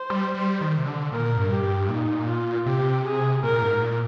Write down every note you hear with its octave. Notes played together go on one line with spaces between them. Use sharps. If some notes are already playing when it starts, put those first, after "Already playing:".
Already playing: C5
G3
G3
D#3
C3
D3
A#2 A#4
G2
G4
G2
A#2 D#4
F4
C3 G4
G#4
A#2 A#4
A#2
G#2
A#2